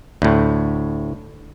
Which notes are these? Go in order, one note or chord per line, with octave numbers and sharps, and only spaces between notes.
D2 A2